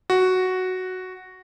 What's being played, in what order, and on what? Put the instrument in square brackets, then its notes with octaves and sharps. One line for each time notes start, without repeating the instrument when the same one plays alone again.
[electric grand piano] F#4